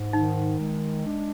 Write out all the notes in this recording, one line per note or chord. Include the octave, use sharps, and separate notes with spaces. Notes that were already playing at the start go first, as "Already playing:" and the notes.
Already playing: G#2
D#3 D#4
G#3
D4